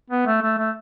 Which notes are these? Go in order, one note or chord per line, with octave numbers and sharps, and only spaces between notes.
B3
A3
A3
A3